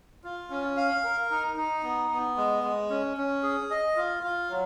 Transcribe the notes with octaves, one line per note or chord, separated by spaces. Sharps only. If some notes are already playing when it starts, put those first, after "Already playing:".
F4
C#4
F5
A#4
D#4
D#4
B3
B3
G#3
G#3
C#4
C#4
G#4
D#5
F4
F4
F#3